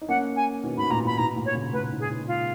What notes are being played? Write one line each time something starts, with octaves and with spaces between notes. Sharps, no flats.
D#4
A#3 C#4 F#5
G#5
B2 D#3
G#2 B2 B5
A#2 A#5
G#2
B5
G#2 B2 A#5
A#2
C#5
A#2 C#3
A#2 B4
G#2
G#4
G#2
F4